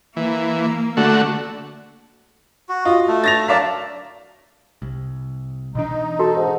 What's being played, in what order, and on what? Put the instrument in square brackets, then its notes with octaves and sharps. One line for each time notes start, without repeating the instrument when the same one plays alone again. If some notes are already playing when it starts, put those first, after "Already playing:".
[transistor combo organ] E3 [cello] A#3
[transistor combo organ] D3 A3 F#4
[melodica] F#4
[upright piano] F4 [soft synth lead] F#4 [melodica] D#5
[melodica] A3
[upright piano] A6 A#6 F7
[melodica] F#3 A#4 A5 [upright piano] D5 F5 B6
[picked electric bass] C2
[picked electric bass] B2 E3 D4 [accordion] D#4
[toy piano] F#4 [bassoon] A4
[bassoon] G#2